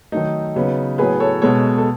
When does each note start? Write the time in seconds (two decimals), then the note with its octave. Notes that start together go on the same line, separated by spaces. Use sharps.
0.12 D#3 F#3 A3 D#4
0.56 C#3 F#3 B3
0.98 A2 F#3 B3 G#4 B4
1.20 A4 C#5
1.42 B2 G#3 B3 A4 C#5
1.78 A4